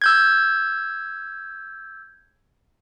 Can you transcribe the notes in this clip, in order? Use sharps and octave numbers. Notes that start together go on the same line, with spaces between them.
E6 G6 G#6